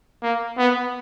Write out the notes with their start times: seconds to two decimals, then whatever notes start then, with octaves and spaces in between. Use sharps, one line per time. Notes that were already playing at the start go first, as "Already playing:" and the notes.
0.22 A#3
0.58 B3